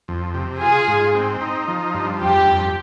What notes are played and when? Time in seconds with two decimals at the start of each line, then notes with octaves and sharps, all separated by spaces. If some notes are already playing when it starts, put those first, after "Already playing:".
0.08 F2
0.34 C3
0.61 F4 G#4
0.88 G#2
1.15 C4
1.41 D#4
1.68 F3
1.94 G2
2.21 F2 G4
2.47 F2